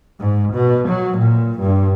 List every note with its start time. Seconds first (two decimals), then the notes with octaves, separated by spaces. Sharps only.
0.19 G#2
0.54 B2
0.88 F#3
1.19 A#2
1.60 G2